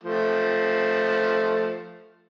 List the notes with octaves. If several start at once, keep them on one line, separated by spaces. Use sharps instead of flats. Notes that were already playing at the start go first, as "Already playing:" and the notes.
F3 A3